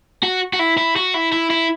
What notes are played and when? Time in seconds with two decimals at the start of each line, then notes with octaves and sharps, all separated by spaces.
0.23 F#4
0.54 F#4
0.59 E4
0.78 E4
0.96 F#4
1.14 E4
1.32 E4
1.50 E4